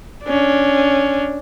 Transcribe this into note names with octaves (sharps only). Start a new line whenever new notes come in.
C#4 D4